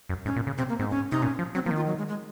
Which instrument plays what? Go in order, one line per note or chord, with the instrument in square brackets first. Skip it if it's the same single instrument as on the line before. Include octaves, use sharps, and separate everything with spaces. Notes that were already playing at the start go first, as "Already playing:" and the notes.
[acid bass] F#2
[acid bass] G#2 [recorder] C#4
[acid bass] A#2
C#3
[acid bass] C3 [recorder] C4
[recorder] A#3
[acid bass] G#2 [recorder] C4
[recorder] C#4
[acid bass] C3 [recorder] D#4
[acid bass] A#2 [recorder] C#4
[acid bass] F3
[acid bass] F#3 [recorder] C4
[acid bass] F3 [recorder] A#3
[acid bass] D#3
[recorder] F4
F#3
G#3
G#3